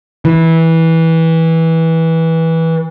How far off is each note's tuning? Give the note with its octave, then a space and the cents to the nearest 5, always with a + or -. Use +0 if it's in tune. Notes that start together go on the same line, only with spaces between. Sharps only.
E3 -15